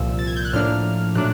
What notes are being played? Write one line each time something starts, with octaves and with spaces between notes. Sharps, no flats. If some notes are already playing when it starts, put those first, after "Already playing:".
Already playing: C2 A#2 F3 E6
A6
G#6
G6
F#6
A2 F3 A#3 D4 F6
A#2 F#3 A3 D4 F#6